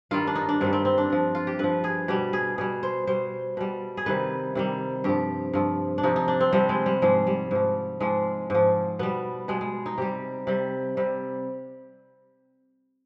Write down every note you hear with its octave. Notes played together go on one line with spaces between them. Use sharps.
G2 D#3 G3 F4
D4
D#4
D4
G2 D#3 G3 C4
C4
C4
D4
G2 F3
F4
G4
G2 F3 B4
G#4
B2 G3 G4
G#4
B2 G3 G#4
C5
B2 G3 C5
B2 G3
G#4
C3 D#3 G3 B4
C3 D#3 G3
G2 F3 G4
G2 F3
D4
C3 F3 D#4
D#4
D4
C4
C3 F3 G3
G#3
G3
G#2 F3 G#3
G3
G#2 F3
G#2 F3 G#3
G#2 F3
B2 G3 B3
B2 G3 G#3
G#3
D#4
C3 G3 G4
C3 G3
C3 G3